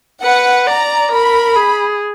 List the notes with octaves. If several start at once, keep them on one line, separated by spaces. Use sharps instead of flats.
B4 F#5
D5 A#5
A#4 B5
G#4